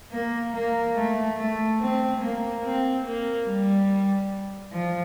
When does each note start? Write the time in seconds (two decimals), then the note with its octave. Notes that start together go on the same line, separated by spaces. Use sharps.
0.11 A#3
0.53 A#3
0.96 A3
1.37 A3
1.80 C4
2.21 A#3
2.63 C4
3.05 A#3
3.47 G3
4.72 F3